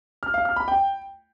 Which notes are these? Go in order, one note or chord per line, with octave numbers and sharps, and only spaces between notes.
F6
F5
F6
B5
G5